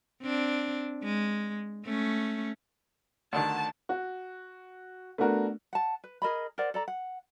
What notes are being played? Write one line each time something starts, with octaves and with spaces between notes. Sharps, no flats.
C4 D4
G#3
A3 C#4
D2 D3 D#3 A5
F#4
A3 B3 D4 F#4 A#4
F#5 A5
B4
G#4 A#4 D#5 B5
A#4 C5 D5 F#5
A4 D5 A#5
F#5